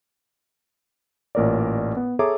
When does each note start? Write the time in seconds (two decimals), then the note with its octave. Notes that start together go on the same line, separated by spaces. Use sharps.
1.35 A1 A#2 A#4 C#5 D5
1.97 B3
2.19 G#4 A4 C#5 E5 A#5 D6